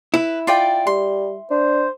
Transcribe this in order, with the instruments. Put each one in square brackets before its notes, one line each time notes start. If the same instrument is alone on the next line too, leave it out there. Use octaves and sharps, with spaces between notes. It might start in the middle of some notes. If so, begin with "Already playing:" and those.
[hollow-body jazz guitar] E4 [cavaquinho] B4
[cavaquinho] F4 D5 G5
[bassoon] G3 [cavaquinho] C6
[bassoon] D4 [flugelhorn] C5